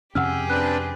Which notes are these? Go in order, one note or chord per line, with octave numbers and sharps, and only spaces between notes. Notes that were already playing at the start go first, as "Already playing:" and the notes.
F2 C3 C#4 G4 G#4 F#5 E6 F6
C4 D4 B4 F#6